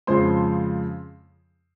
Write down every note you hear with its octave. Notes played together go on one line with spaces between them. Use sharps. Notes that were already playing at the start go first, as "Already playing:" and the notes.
F2 C#3 F3 G#3 C5 C6